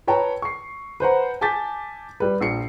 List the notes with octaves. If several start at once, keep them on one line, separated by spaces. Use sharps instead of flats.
B4 C#5 G5 A5 A#5
C#6 C7
B4 C5 F#5 A#5
G#5 A5 D6 G6 A6 B6
G3 B4
A#1 C7 C#7